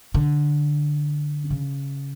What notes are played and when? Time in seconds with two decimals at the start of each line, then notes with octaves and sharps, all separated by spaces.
0.14 D3
1.50 C#3